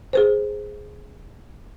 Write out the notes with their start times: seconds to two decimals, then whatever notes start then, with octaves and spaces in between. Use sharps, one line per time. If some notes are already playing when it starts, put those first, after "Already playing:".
0.13 G#4 B4 C5